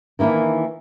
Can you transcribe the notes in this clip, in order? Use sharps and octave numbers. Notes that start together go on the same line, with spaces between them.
D#3 E3 A#3 D4 E4